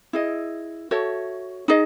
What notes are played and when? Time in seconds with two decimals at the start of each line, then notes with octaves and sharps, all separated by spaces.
0.13 E4 G#4 D#5
0.91 F#4 A4 C#5 E5
1.68 D#4 G#4 D#5